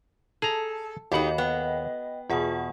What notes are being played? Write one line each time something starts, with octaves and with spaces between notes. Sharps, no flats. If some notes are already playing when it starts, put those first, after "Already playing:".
G#4 A4 A#5
D#2 D#4 F#4 G4 A4 D#5 F#5 B5
B3 G5
E2 B2 F4 G#4 F#5